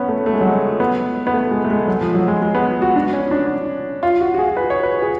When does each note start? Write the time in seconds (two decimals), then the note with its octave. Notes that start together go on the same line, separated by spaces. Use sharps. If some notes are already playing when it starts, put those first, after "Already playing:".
Already playing: B3 C#4
0.08 A3
0.26 A3
0.34 G#3
0.41 F#3
0.47 G#3
0.80 B3
1.27 B3
1.33 A3
1.51 G#3
1.64 A3
1.70 G#3
1.87 F#3
2.01 F3
2.14 F#3
2.28 G#3
2.42 G#3
2.55 B3
2.82 F#4
2.96 D4
3.13 C#4
3.31 D4
4.03 F4
4.21 F#4
4.34 F#4
4.38 G#4
4.57 B4
4.70 C#5
4.83 B4
5.02 G#4